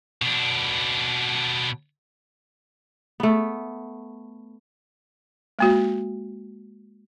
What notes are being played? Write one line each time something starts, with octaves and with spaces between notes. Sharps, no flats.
B2 D4
A3 B3
G#3 A#3 F#4